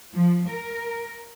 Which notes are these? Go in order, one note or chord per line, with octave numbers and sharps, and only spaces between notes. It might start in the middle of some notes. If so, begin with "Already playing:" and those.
F3
A#4